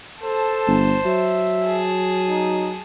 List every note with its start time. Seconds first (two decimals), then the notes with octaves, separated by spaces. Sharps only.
0.23 A4 C5 A5
0.68 G1
1.05 F#3 E5
1.67 G#4 A5
2.29 D#4